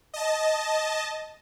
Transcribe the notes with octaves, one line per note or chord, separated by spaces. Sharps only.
D#5 A5